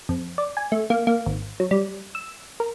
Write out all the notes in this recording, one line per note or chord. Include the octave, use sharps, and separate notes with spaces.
F2
D5
G#5
A3
A#3
A#3
G#1
F#3
G3
E6
A#4